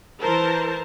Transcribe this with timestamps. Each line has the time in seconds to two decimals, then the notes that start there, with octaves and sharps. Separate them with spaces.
0.22 E3 A#4 C5 A5